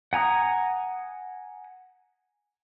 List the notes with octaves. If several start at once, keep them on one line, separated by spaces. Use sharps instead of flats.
F#5 G#5 A#5 D#6